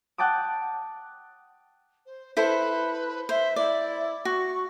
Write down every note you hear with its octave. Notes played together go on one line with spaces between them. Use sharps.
F#5 G5 A5 D6 D#6
C5
E4 A4 B4 C5
C5 E5
E4 D5
F#4 C#6